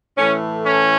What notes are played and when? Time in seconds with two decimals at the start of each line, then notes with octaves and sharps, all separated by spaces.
0.18 A2 E3 A3 C#4
0.65 C#4